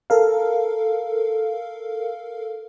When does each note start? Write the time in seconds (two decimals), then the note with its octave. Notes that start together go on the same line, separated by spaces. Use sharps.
0.10 A4 A#4 F5